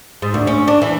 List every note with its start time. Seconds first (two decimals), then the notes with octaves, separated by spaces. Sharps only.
0.22 G#2
0.34 D2
0.47 C#4
0.68 D4
0.82 E3